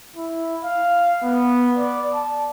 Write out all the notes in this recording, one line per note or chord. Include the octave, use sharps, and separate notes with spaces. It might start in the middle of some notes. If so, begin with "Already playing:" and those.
E4
F5
B3
D5
A5